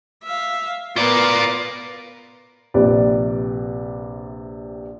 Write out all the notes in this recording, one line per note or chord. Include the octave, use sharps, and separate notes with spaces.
E5 F5
B3 F4 A#4 D5
A#1 C3 G4 B4 D5